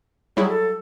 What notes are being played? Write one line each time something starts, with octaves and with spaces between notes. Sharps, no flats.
F#3 G3 E4 G#4
A4